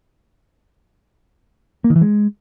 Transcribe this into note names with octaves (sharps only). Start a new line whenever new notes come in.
A#3
D#3
E3
G#3